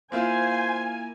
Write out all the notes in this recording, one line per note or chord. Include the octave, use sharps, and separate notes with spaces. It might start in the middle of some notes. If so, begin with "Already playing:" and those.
A#3 E4 F4 C5 G#5